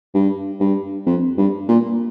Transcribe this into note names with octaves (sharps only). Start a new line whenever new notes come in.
G2
G2
F2
G2
A#2